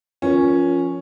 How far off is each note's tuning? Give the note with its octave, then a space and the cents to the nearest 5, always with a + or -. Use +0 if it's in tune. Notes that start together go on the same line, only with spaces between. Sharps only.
F3 +0 C#4 +0 A#4 +15